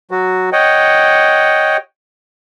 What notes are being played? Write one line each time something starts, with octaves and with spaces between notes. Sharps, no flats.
F#3 F#4
C#5 D#5 F#5 G5